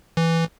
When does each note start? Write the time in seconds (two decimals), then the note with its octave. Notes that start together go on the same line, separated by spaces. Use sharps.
0.17 E3